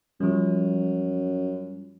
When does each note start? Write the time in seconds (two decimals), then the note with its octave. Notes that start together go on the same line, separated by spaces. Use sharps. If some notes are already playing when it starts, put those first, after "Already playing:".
0.20 F#2 F3 G3